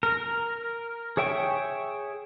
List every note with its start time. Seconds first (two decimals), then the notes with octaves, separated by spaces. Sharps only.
0.03 A#4
1.17 G#4 C#5 E5 G5 C#6